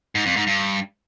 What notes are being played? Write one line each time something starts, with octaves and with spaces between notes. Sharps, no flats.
G#2
F2
G#2
G2